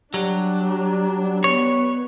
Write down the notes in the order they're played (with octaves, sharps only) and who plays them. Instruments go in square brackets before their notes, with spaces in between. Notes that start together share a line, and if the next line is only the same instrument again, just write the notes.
[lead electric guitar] F#3 [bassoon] G3 [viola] D4
[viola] B3 [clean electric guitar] C#5